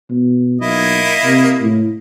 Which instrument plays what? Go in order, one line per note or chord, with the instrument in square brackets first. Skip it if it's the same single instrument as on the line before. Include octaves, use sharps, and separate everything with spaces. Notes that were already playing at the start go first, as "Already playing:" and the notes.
[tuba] B2
[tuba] B1 [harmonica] A#3 E4 D#5
[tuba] C3
A2